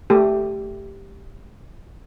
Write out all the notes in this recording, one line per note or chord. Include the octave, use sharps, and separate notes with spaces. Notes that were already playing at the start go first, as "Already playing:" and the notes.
A3 G4